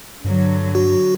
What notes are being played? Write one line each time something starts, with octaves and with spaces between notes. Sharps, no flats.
G2 D3 F#3
F#4